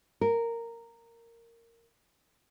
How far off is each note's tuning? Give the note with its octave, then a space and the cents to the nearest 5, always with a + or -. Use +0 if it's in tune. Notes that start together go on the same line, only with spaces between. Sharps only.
A#4 -10